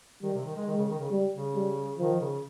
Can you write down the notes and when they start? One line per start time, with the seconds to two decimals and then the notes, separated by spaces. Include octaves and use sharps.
0.23 D#3 G3
0.34 C3
0.45 D#3
0.56 G#3
0.67 D#3 G#3
0.77 C#3
0.89 D#3
1.00 C#3
1.11 G3
1.33 C#3
1.55 G3
1.98 D#3 F3
2.20 C#3